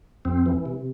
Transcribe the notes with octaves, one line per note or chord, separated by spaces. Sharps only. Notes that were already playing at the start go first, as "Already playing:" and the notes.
F2 C4
E3
C3